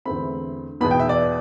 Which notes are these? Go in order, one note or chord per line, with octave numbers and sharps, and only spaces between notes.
E2 D3 A3 C4 B5
E2 B2 B3 B5
G5
E5
D5